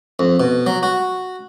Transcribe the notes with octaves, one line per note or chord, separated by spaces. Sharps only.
F2
B2
F#3
F#4